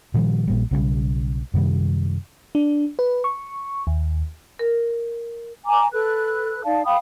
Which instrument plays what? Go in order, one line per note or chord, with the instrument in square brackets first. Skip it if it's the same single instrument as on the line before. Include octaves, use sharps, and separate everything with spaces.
[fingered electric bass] A#2 D#3 F3 G3
A#1 A#2 G3
B1 C#3 E3 G3
F#2 C3 D#3 G3
[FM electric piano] D4
B4
C#6
D#2
[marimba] A#4
[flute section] G#5 A#5 D6
A4 B4 F#6
D#4 D5 F5 A5
F5 G5 B5 D#6